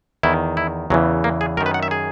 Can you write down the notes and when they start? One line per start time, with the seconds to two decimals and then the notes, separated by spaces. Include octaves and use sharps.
0.23 E2 D#3 E4
0.57 E4
0.90 E2 C#3 E3 F#3
1.24 A#3
1.41 G#4
1.57 F#2 D#3 A#4
1.66 B4
1.74 F#5
1.83 E5
1.91 G#4